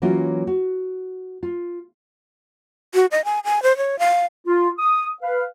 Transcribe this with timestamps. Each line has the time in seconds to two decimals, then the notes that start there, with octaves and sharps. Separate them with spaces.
0.02 E3 F#3 A#3 C#4 F4 F#4
0.47 F#4
1.43 F4
2.94 F#4
3.11 D#5
3.25 G#5
3.44 G#5
3.63 C5
3.77 C#5
3.99 F5
4.46 F4
4.79 D#6
5.21 B4 F5